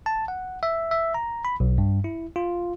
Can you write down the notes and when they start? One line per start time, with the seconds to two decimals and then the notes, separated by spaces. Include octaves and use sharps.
0.06 A5
0.28 F#5
0.63 E5
0.91 E5
1.14 A#5
1.45 B5
1.60 B1
1.78 G2
2.04 E4
2.36 F4